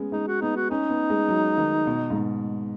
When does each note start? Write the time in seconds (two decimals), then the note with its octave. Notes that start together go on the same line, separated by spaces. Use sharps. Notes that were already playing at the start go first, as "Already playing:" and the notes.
Already playing: G#3 B3 C#4
0.12 G#3 D#4
0.27 F#4
0.41 B3 D#4
0.56 F#4
0.70 C#4 D#4
0.90 B3
1.10 G#3
1.28 F#3
1.58 D#3
1.87 B2
2.10 G#2
2.16 B2